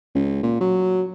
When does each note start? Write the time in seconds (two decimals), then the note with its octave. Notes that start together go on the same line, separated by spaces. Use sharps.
0.15 C#2
0.43 A#2
0.61 F#3